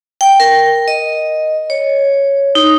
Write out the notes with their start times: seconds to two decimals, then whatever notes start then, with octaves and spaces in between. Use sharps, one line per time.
0.21 G5
0.40 A#4
0.88 D#5
1.70 C#5
2.55 D#4